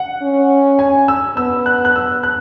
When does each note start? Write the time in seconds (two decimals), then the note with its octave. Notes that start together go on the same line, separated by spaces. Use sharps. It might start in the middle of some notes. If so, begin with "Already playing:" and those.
Already playing: F#5
0.22 C#4
0.79 G#5
1.08 E6
1.37 B3 E6
1.66 F#6
1.85 F#6
1.96 E6
2.23 F#6